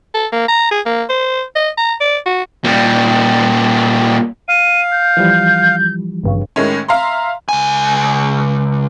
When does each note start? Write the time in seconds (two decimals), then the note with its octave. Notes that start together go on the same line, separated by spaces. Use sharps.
0.14 A4
0.32 A#3
0.48 A#5
0.71 G#4
0.86 A#3
1.09 C5
1.56 D#5
1.78 A#5
2.01 D5
2.26 F#4
2.64 A#2 G3
4.49 F5 D#7
4.92 G6
5.17 E3 F3 G3
6.24 G#1 G2 C#3
6.56 A2 D#3 G#3 A3 C#4
6.88 E5 F5 A#5 C6
7.49 C#2 G#5